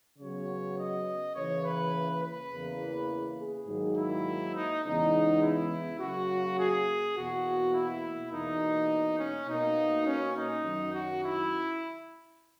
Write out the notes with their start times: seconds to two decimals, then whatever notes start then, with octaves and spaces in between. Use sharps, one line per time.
0.19 C#3 F#3 B3 C#5
0.77 D#5
1.35 C#3 E3 A#3 C#5
1.65 B4
2.23 B4
2.52 E2 C#3 E3 A#3
3.38 G#4
3.67 G#2 D#3 F#3 A#3
3.97 E4
4.55 D#4
4.84 E2 C#3 G#3 B3 D#4
5.42 E4
6.00 C#3 F#3 A#3 F#4
6.58 G#4
7.16 E2 B2 A#3 F#4
7.74 E4
8.32 E2 B2 A#3 D#4
9.19 C#4
9.48 B2 A#3 D#4
10.07 C#4
10.36 D#4
10.64 F#2 D#3 F#3
10.94 F#4
11.23 E4